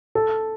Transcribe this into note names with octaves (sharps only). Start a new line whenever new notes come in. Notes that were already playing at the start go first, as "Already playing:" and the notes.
A4